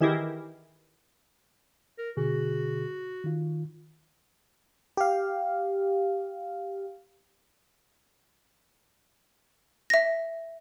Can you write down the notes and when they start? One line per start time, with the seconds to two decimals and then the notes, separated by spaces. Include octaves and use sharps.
0.01 D#3 E3 E4 G4 G#4 A#4
1.98 A#4
2.17 B2 D3 F#4 G#4
3.24 D#3 F4
4.97 G4 F5
9.90 E5 A#6